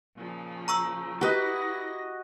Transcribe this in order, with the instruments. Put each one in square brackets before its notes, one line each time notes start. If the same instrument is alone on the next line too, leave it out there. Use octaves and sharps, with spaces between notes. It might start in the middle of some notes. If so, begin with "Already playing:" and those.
[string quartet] A#2 C#3 F3
[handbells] A#5 C#6 E6
[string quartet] E4 A#6 [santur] F#4 D#5 [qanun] G4 B4